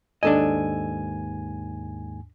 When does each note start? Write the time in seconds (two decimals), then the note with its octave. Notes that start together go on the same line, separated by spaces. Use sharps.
0.23 D#2 G#2 D4 A4 D#5 G#5